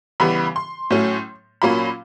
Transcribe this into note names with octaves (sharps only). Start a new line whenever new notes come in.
C#3 E3 G3 B3 B5
C6
A2 F#3 A3 C#4
A#2 F#3 A#3 C#4 B5